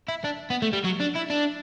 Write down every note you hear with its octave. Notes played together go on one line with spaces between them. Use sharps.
E4
D4
B3
A3
G3
F#3
D4
E4
D4